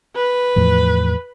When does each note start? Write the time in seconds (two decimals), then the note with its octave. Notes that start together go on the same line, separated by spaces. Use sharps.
0.16 B4
0.56 E2 A2 F3